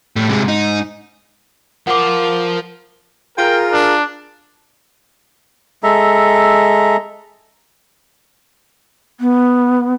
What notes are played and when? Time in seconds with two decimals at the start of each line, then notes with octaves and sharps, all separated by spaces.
0.16 A2 G3 A3
0.29 G#2 C3 G#3
0.48 D#4
1.87 F3 A#4 F#5 C6 D6
3.38 F4 G#4 A#4 G5
3.73 D4
5.83 G#3 A4 E5 A#5
9.20 B3